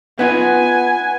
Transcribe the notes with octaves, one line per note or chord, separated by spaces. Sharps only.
B3 D#4 F4 B4 F#5 G#5 G#6